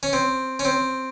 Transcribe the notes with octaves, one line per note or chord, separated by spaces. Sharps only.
C#4
C4
C#4
C4